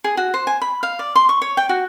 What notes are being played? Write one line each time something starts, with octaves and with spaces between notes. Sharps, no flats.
G#4
F#4
C5
G#5
B5
F5
D5
C6
C#6
C#5
G5
F#4